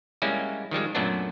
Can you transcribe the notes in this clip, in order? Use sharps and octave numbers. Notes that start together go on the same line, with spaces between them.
G3 G#3 A#3 C#4 E4
D#3 F3 G3 G#3
F#2 A#2 F#3 A3 B3 D4